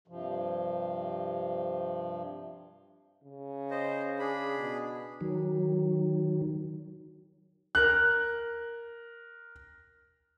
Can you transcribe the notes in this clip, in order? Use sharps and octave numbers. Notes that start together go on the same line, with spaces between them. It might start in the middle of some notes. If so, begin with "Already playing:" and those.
G2 C3 F3
C#3
C5 D#5
D4 G#4 B5
B2
D#3 F#3
A#4 F#6